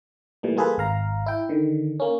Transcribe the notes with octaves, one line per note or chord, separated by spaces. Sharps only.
A#2 E3 G3 A3
G3 A#3 F4 G#4 A4 B4
G#1 F5 A#5
E4 G5
D3 D#3
A#3 C#4